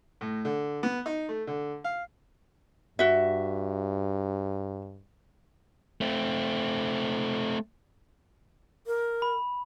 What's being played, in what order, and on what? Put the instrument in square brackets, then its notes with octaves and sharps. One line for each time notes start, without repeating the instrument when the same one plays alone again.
[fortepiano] A2
D3
B3
D#4
A3
D3
F5
[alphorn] G2 [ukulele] F#4 E5
[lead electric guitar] A3 C4
[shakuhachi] A#4
[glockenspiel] B5